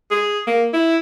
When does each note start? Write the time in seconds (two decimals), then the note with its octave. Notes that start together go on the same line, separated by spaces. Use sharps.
0.11 G#4
0.47 A#3
0.73 E4